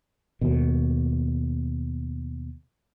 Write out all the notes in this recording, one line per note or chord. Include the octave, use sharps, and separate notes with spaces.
D#2 B2